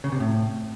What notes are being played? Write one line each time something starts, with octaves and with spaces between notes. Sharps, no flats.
C#3
C3
A2